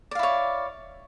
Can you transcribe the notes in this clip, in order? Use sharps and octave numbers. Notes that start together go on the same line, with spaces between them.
E4 C#5 D5 F5